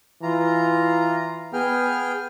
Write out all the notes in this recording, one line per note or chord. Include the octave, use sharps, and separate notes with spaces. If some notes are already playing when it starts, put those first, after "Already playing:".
E3 F4 A#5
B3 G#4 G5 F6